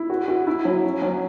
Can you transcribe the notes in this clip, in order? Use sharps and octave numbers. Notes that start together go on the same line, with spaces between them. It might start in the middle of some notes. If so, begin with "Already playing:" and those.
Already playing: E4
F#4
F#4
E4
F#3
C#4
F#3